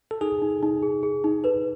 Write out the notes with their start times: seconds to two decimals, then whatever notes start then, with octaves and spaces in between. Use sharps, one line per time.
0.11 A4
0.21 D#4 G#4
0.42 D#4
0.63 D#4
0.83 G#4
1.03 G#4
1.24 D#4
1.44 A4 B4